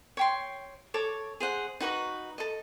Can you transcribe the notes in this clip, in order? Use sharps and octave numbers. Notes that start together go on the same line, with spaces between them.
C#5 G5 C6
A4 C#5 D6
G#4 C5 F#5
D#4 F#4 B4 C#6
A4 D#5